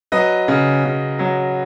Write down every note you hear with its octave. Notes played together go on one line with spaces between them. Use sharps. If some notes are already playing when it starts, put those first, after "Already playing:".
F#3 B4 D#5
C#3
C#3
F#3